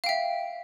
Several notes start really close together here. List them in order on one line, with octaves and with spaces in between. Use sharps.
F5 G5 E5